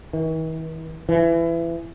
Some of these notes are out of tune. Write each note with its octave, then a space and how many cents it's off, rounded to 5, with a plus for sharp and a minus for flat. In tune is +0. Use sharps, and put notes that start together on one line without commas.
E3 -45
E3 +25